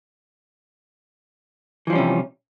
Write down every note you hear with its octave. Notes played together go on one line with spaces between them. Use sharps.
C3 E3 F3 G3 C#4